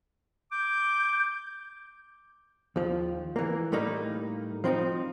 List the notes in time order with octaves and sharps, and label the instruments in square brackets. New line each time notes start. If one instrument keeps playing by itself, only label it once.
[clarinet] D6 [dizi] G6
[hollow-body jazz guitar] D#2 F3
E3 A#3
A2 G3 A3 A#3 D#4
F3 C4 D4 D#4